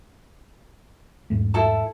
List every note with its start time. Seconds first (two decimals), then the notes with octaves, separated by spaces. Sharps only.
1.30 E2 G#2 A3
1.54 E4 A4 A5